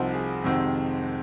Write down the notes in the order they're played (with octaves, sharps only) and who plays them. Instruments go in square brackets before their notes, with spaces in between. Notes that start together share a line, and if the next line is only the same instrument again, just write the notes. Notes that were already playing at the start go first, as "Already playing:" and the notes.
Already playing: [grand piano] C2 C3 F3 C4 D#4 F#4
G#4
F2 C3 D#3 G#3 C4 F#4